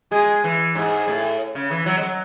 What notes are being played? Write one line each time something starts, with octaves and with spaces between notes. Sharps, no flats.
G#3 G#4
E3
G#2 G#4
A2
C#3
E3
F#3
G#3
F#3